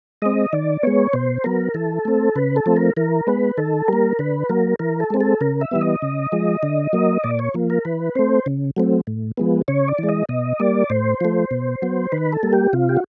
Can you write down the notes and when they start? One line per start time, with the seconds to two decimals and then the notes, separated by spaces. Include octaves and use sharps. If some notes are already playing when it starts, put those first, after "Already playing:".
0.22 G#3 C4 D#5
0.53 D#3 D5
0.83 G#3 B3 C#5
1.13 B2 C5
1.44 F#3 B3 A#4
1.74 E3 A4
2.05 A3 C4
2.35 C#3 B4
2.56 A4
2.66 F3 A3 C4
2.76 A#4
2.97 E3 A#4
3.27 G#3 B3 B4
3.58 D#3 A4
3.88 G3 A#3 A#4
4.19 D3 B4
4.49 F#3 A#3 A#4
4.79 E3 A#4
5.00 A4
5.10 G#3 C4
5.20 A4
5.41 C#3 A#4
5.61 E5
5.71 E3 G3 B3
5.81 D#5
6.02 C#3
6.32 F3 G#3
6.63 D3
6.93 F#3 A#3
7.24 A#2 D5
7.39 C#5
7.54 F3 A#3
7.70 A#4
7.85 E3 B4
8.15 A3 C4 C5
8.46 C#3
8.76 F#3 A3 C4
9.07 A2
9.37 F3 G#3 B3
9.68 C#3 C#5
9.88 D5
9.98 E3 G#3
10.09 D#5
10.29 B2 D#5
10.60 G3 A#3 D5
10.90 A2 C5
11.21 F3 A3
11.51 B2
11.82 F#3 B3
12.12 D#3 B4
12.32 A4
12.43 G3 A#3
12.53 G4
12.73 C3 F4
12.89 G4
12.97 F#4